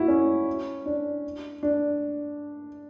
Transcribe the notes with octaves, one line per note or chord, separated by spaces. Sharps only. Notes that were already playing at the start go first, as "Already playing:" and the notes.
Already playing: E4 F#4
C#4
D4
D4